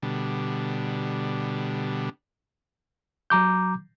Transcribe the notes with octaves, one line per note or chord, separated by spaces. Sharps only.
B2 D3 G3
F#3 A#5 D6 G6